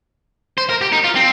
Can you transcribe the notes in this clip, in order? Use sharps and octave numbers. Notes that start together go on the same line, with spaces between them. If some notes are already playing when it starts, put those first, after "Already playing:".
C5
A#4
G4
D#4
F4
C4